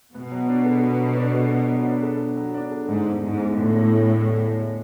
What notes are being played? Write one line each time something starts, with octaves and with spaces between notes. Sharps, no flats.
B2 B3
F#3
D4
A4
B3
F#3
D4
A4
B3
F#3
D4
A4
B3
F#3
D4
A4
G#2 D3
E2
G#2 G#3
E2
A2 D3
E2
G#3
E2
D3
E2
G#3